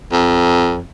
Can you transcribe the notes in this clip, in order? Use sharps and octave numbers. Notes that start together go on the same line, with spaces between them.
F2